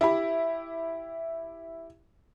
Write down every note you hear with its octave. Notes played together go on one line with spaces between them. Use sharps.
E4 G4 B5